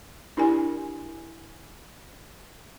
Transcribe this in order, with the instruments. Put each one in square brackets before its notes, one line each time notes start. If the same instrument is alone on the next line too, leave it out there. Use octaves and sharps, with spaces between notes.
[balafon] D4 E4 G4 A#4 D5 G#5